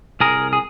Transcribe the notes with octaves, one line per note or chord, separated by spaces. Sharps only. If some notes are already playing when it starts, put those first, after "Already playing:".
C2 G#4 A#4
G#4